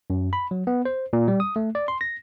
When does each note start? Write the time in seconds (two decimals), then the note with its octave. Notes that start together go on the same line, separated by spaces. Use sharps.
0.10 F#2
0.33 B5
0.51 F#3
0.67 B3
0.85 C5
1.13 A#2
1.28 G3
1.40 D#6
1.56 A3
1.75 D5
1.88 C6
2.01 A#6